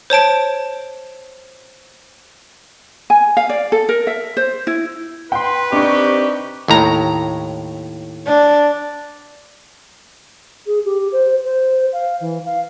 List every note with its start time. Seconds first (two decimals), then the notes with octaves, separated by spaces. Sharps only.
0.10 C5 C#5 A5 D7
3.10 G#5
3.37 F5
3.49 D5
3.72 A4
3.89 A#4
4.07 E5
4.37 C5
4.67 E4
5.32 B4 G5 C6
5.73 C3 C4 D4 D#4 G4 D5 C#6
6.68 D#2 A2 A#5
8.28 D4
10.66 G#4
10.85 G4
11.12 C5
11.44 C5
11.93 F5
12.20 E3
12.45 F5